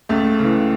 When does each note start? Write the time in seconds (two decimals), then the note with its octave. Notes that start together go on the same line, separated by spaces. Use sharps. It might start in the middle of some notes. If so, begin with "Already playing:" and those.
0.09 C#2 A3
0.39 C#3 E3